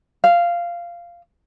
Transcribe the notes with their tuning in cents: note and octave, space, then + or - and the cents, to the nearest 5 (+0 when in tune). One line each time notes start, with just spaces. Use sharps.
F5 -10